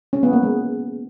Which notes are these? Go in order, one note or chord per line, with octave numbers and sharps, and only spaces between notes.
C#4
B3
A#3
G#3